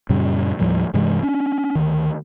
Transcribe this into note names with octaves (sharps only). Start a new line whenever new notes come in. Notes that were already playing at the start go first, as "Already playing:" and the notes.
F#2 A#2 C#3 G3
D#2 A2 F3 G3
G2 C3 E3 G#3
C#4 D4
D2 D#3